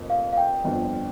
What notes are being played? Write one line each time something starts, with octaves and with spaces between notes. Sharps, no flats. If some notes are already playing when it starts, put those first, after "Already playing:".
Already playing: F1 F2 A#3
F5
F5
G5
G1 F2 D3